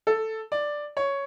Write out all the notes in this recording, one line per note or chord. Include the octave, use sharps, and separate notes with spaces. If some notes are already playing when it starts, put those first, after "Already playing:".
A4
D5
C#5